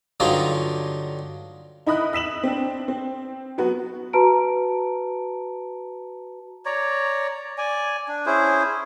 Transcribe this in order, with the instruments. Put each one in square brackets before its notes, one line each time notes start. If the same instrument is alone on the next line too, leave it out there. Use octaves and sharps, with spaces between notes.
[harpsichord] G2 D3 F#3 D#4 F4
[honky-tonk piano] D#4 E4 D#5 B5 D#6 F#6
E6 B6 E7 F#7
C4 D4
C4
F#3 B3 F#4
[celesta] F#4 B4 A5 A#5 D7
[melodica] C#5 D5 A#5
D5 G#5
D4
C#4 E4 G#4 C5